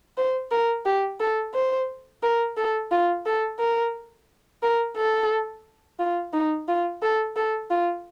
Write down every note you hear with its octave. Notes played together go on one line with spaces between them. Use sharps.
C5
A#4
G4
A4
C5
A#4
A4
F4
A4
A#4
A#4
A4
F4
D#4
F4
A4
A4
F4